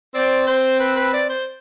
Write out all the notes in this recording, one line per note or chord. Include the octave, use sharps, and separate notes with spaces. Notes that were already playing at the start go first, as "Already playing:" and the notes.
C4 D5
C5
B4
B4
D5
C5